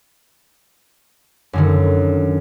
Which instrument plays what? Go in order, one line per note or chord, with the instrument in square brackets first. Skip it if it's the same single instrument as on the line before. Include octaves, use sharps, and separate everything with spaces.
[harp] F#2 D3 D#3